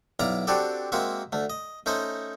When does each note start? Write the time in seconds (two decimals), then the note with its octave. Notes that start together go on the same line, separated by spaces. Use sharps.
0.19 B1 E4 D5 F5 A#5
0.47 C4 D4 F#4 G4 A4 D5
0.92 G#3 A#3 C4 F#4 E5
1.32 D2 A3
1.50 D#5
1.86 A3 C#4 D#4 C5 D#5